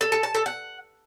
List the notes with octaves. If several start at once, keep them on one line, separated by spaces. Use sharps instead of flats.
A4
A4
A5
A4
F#5